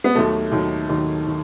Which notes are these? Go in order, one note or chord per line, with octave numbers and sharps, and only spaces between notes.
B3
D#2 D#3 F#3 A3
D#2 D#3 F#3
D#2 D#3 F#3
D#3